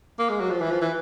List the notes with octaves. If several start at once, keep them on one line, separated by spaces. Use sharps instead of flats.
A#3
G#3
F#3
F3
E3
F3
E3